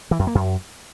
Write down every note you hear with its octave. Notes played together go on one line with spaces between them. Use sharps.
E3
F#2
A#3
F#2